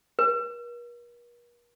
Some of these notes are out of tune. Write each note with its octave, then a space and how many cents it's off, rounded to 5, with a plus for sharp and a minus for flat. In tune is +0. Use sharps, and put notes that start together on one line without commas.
A#4 +45